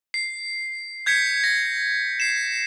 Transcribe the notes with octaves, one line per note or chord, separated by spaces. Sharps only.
C7
G6 G#6 B6 C#7
A#6
C7 E7